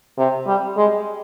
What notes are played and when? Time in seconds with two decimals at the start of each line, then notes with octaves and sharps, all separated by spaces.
0.18 C3
0.47 G3
0.77 G#3